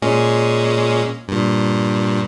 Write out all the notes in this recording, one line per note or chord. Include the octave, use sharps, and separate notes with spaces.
A#2 G#3 C#4
G2 A#2